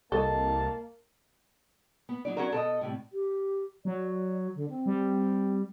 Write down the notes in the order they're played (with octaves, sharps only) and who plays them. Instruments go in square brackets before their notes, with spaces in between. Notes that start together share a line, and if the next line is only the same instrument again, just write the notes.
[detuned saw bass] C2 [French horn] A#3 [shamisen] A4 D#5 [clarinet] A5
[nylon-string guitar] B3
F#3 D#4 D5
[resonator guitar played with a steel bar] C#4 F#4 A#4
[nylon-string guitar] B2 [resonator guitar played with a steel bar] A4 A#4 D#5
[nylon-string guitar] A2 C3 G3
[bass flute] G4
[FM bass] F#3 [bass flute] D5
[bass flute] D3
C4
[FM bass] G3